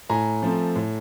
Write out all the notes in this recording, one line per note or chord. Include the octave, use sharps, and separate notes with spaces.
A2 G#5 A#5
F3 A3 C4
A2